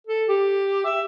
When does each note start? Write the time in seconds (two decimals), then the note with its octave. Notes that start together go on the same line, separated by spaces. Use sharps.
0.07 A4
0.28 G4
0.85 E5